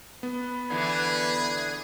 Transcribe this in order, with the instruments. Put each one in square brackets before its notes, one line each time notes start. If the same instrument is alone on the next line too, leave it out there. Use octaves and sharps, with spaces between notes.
[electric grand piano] B3 [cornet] B4
[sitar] D3 E3 [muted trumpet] G#4